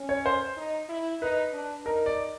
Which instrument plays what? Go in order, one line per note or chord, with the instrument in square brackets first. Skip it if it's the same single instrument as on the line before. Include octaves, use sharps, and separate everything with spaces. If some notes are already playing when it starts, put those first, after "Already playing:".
Already playing: [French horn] C#4
[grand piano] C#5
C5
[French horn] D#4
E4
[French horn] D#4 [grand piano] B4
[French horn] D4
[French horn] D#4 [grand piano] A#4
[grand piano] D5